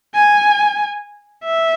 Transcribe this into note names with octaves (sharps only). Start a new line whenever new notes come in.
G#5
E5